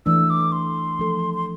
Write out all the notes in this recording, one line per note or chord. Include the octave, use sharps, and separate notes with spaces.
E3 A3 D4 E6
D6
C6
F3 A3 D4 A4
C6